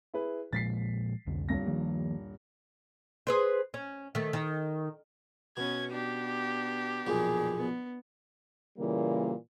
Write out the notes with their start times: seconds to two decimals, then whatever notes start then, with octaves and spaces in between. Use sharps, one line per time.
0.14 E4 G#4 B4
0.53 A#2 F3 G#3 A6 B6 C7
1.27 C2 F2 D3
1.49 D#1 G2 A#6
1.67 D#3 F3 A#3
3.27 G#4 B4 C5
3.74 C#4
4.15 D#3 A3
4.33 D#3
5.57 B2 B3 C#4 G#6
5.92 B3 D4 G4
7.07 B1 F2 A#2 G#4
7.55 B3
8.78 A#2 C#3 E3 G3 A#3